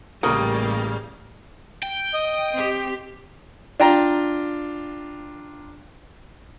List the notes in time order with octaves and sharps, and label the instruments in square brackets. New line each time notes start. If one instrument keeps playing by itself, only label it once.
[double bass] A1 [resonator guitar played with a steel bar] C#3 [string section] G3 A#3 [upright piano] A#4
[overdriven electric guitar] G5
[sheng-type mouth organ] D#5
[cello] C4 G4
[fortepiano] D4 F4 G5 A#5